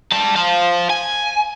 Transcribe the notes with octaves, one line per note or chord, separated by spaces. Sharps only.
G3 A5
C5 F5
G#5